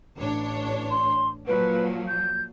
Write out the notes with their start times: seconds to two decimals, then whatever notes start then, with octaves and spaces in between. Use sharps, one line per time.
0.18 A1 D4 C#5
0.91 C6
1.47 A#2 F3 F#3 B4
2.08 G6